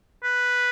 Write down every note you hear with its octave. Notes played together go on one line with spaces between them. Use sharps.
B4